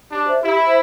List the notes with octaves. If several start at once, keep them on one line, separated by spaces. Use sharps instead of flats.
D4 G4
C5 E5
E4 G4
C5 E5